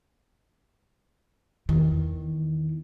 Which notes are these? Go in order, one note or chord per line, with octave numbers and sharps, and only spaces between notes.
E2 D#3